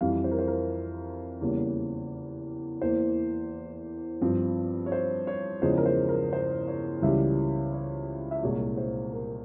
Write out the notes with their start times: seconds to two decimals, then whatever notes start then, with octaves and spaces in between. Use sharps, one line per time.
0.01 F2 E3 G3 F5
0.24 C5
0.31 A#4
0.39 C5
0.48 A#4
1.41 E2 C#3 G3 A#3
2.82 E2 E3 A#3 C5
4.21 G2 F3 C4
4.86 C#5
4.92 C5
5.27 C#5
5.62 E2 C#3 F3 G#3 C5
5.77 A#4
5.86 C5
6.09 A#4
6.33 C5
6.67 C#5
7.02 C#2 C#3 E3 G3 E5
7.73 C#5
8.31 E5
8.43 C2 A#2 G#3 C#5
8.77 C5
9.13 A#4